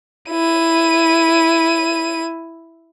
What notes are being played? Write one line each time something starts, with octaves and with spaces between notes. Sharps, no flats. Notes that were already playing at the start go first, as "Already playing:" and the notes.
E4 D#7